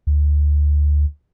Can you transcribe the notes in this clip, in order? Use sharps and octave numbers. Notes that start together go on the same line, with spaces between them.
D2